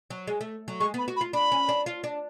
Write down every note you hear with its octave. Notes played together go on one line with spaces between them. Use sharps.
F#3
G#3
A3
F#3
G#3 C#6
B3 B5
F#4
B5
F4
D4 B5
C#4
D4
F4
D4